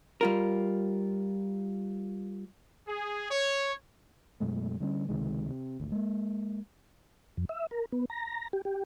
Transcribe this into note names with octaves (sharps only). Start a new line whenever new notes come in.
G3 F4 A#4
G#4
C#5
F#2 B2 G#3 A3
D3 G3 B3 C#4
C#2 C3 D#3 G#3
C3
G#1 D2
G#3 A#3
F2
E5
A#4
B3
A#5
G4
G4